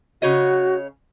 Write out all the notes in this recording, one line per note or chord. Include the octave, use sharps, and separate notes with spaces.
C#3 F#4 C#5 D#5